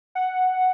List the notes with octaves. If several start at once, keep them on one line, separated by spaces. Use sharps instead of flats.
F#5